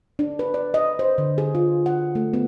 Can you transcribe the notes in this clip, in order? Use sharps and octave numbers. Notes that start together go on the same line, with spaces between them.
D4
B4
D5
D#5
C5
D3
G#4
F4
F#5
A3
B3